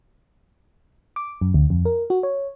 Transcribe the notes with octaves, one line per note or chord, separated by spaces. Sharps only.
D6
F#2
D2
F2
A#4
F#4
C#5